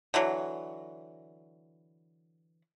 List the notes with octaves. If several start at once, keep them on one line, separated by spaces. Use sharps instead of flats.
D3 E3 F#3